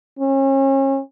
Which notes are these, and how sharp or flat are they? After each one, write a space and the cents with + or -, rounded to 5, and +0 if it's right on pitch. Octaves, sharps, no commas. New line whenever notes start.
C#4 -35